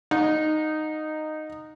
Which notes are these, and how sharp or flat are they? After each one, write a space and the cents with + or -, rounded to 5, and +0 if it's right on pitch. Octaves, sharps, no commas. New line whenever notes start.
D#4 -10 F#5 -40